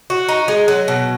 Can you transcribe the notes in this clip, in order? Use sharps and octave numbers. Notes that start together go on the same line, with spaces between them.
F#4
D#4
G#3
F#3
B2